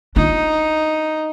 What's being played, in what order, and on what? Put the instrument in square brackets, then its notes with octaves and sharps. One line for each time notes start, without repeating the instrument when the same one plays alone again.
[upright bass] D4 F4 [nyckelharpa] D#4